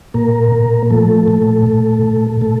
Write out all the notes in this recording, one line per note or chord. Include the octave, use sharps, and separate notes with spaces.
A#2 A#3 A#4
A#2
F3 A3 A4
A#2
A#2
A#2
A#2 A3 A4